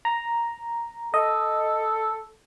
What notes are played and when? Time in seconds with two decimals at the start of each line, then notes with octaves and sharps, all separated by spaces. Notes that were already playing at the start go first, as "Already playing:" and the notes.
0.05 A#5
1.14 A4 D#5